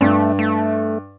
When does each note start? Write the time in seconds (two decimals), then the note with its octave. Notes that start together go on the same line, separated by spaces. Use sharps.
0.01 G2 A3
0.39 A3